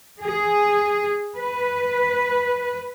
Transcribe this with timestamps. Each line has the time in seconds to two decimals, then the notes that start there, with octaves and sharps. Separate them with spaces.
0.21 G#4
1.35 B4